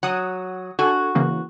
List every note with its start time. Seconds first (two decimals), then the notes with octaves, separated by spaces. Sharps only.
0.03 F#3 F#5 D#6
0.79 D4 F#4 A4 G#5
1.15 C#3 E3 A#3